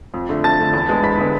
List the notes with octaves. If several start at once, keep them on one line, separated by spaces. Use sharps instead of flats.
F2
D3 A3
F2 A5 A6
D3 A3
E2
D3 G#3 B3
E2 B5 B6
D3 G#3 B3